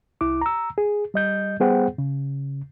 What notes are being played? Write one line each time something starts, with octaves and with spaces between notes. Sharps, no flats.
C2 E4 D6
A#5 E6
G#4
G3 D#5 G6
G3 B3 G#4 C5 F#5 G5
C#3